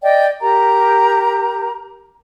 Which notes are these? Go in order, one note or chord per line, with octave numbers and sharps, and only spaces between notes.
D5 D#5 G5
G4 A#4 A#5